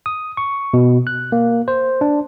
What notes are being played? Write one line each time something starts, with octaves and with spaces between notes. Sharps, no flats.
D#6
C#6
B2
F#6
A#3
C5
D4